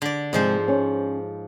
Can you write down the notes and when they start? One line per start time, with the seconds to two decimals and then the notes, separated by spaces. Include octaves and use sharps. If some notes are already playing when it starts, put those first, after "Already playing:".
0.02 D3 D5
0.33 G#2 C3 F3 G#3 C5
0.68 C#4